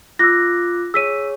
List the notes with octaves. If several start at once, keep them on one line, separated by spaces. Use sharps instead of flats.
F4 D6 E6 F#6 A#6
G#4 C#5 E6 B6 D#7